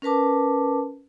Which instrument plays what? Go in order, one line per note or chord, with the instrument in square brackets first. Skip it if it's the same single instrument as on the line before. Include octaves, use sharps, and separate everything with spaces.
[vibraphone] C#4 A#4 B4 A5 D6